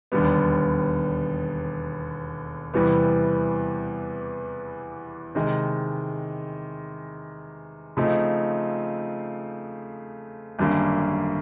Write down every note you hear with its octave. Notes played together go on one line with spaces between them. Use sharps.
E1 D#2 D3 G3 B3
E2 C3 E3 G3 B3
C3 D#3 G#3
C#3 F3 A3 C4 D#4
G#1 F#2 D3 G3 A#3